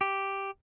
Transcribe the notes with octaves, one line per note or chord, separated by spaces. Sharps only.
G4